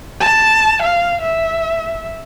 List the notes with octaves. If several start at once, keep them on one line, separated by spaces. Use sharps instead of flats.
A5
F5
E5